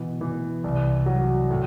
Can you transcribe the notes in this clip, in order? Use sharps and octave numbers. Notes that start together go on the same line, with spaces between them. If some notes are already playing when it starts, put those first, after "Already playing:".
Already playing: B2 E3
E3
C2
F#3
A2